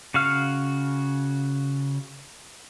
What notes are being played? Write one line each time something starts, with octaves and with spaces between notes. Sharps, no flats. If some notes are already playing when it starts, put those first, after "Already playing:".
C#3 F#4 F5 F6